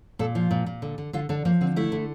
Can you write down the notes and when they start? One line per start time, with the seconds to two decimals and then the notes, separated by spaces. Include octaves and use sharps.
0.19 A#2 A4
0.35 F3 F4
0.51 A#2
0.66 A#2
0.82 D3
0.98 D3
1.13 D3 F4
1.29 D3 D4
1.45 F3 A#3
1.61 D3 C4
1.76 A3 E4
1.92 D3